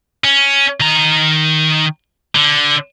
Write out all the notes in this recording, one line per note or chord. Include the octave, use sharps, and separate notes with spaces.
C#4
D#3 A#5
D3